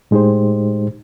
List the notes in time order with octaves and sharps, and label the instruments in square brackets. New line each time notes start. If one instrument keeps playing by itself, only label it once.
[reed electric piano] A2 G#3 D#4 G4 C5